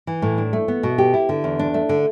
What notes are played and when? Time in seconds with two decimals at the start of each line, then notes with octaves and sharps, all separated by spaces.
0.07 E3
0.22 A2
0.38 D4
0.53 A3
0.68 B3
0.83 B2
0.98 G4
1.14 E4
1.29 D3
1.44 E2
1.59 D4
1.74 A3
1.89 D3